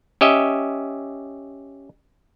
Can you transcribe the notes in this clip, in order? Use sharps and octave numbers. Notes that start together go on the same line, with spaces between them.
C#4 G4 D#5 E5